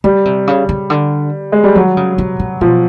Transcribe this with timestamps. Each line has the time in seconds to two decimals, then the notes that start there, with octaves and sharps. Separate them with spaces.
0.04 C#3 G3
0.25 C3
0.47 C#3
0.69 C#3
0.90 D3
1.52 G#3
1.64 G3
1.75 D#3 F#3
1.97 C#3
2.18 C3
2.39 C3
2.61 B2 F3